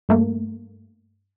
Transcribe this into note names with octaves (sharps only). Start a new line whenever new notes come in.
G2 A3 A#3